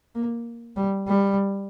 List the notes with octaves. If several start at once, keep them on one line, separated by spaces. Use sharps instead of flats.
A#3
G3
G3